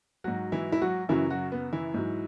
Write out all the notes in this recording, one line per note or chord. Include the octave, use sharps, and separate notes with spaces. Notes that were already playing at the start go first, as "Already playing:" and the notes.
G#2 F#3 F#4
E3 E4
E4
F#3 F#4
F#2 C#3 E3 F#3 E4
F#3 F#4
B3
E3 E4
G#2 F#3